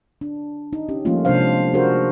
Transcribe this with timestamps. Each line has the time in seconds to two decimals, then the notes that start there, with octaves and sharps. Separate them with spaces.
0.21 D4
0.73 D#4
0.88 C#4 G4
1.05 F3 G3 A3 A#3 C#4 F4
1.25 C3 G#3 C#4 D4 C5 F5
1.73 D4 F#4 G#4 A#4 C5